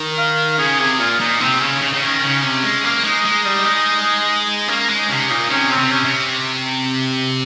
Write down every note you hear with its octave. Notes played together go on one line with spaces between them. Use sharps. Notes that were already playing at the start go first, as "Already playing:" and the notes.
Already playing: D#3
F5
C#3 G#4
C3 G#4
A#2 F4
A#2 D#4
C3 C4
C#3 C#4
C#3 D#4
C#3
D#3 C#4
C#3
C3
G#3
A#3
G#3 D#4
G#3
G3
G#3
A#3 C#4
G#3
D#4
C3 C#4
A#2 D#4
C3 C#4
C4
C3
C#4
C3